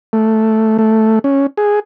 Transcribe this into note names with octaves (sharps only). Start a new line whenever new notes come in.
A3
A3
C#4
G#4